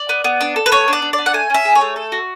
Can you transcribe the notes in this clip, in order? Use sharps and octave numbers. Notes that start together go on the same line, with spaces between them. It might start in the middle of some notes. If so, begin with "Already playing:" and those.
Already playing: D5
B3
B3
D4
A4
B4
B3 C#5
D4 D5
D4
D5
B3
F#5
A3 G#5
C#4 E5
G#4
C#5
A3
A4
F#4